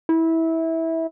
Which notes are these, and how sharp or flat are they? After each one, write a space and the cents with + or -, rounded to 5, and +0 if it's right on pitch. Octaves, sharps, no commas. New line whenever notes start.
E4 -20